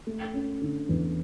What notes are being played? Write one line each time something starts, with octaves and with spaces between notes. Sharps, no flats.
A3
C#4
D3
E2